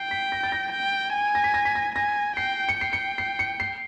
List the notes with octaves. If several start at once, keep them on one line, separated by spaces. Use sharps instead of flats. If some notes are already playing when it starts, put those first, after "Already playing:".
Already playing: G5 C7
B6
A#6
A6
A#6
G5
G#5
A#6
B6
A#6
B6
A#6
G#5 A#6
G5 C7
C#7
G5 C7
C#7
C7
C#7
C7